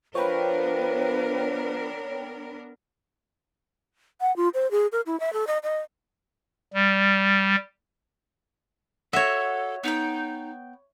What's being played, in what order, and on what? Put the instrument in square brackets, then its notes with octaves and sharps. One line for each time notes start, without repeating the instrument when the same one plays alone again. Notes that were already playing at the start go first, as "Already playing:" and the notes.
[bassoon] F3 [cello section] B3 D4 A#4 [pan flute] B4 [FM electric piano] C#5 G5 B5
[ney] F#5
F4
C5
G#4
A#4
E4
E5
A4
D#5
D#5
[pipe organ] G3
[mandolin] F#4 [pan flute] A4 [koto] C#5 E5
[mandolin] B3 G5 [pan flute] D#4